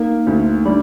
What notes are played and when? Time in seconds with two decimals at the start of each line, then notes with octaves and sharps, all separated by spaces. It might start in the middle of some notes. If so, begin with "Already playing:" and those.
Already playing: A#3 D#4
0.27 D2
0.65 G3 D4